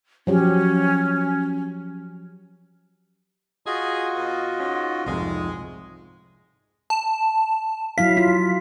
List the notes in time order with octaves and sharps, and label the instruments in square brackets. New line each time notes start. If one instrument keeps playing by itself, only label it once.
[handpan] F3 F#3 G4 [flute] C#4
[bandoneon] F4 F#4 D#5 [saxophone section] G#4
[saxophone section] B2
[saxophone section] G#2 [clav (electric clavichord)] C#4
[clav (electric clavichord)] C2 F2 G#2 [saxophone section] G#3
[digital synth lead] A5
[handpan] F#3 E4 F5 [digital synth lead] B6
[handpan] F4